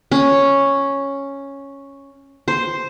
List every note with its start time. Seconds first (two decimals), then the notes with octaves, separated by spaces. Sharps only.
0.12 C#4
2.48 C5